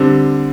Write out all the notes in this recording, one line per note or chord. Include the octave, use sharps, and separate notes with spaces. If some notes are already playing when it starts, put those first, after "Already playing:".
Already playing: D3 G3 C4